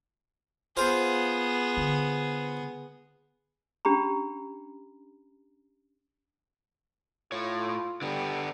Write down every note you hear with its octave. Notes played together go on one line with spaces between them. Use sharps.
B3 F4 G#4 C5 F5
D3
C#4 D4 G4 A#5 B5
A2 F4 C#5
D3 G3 B3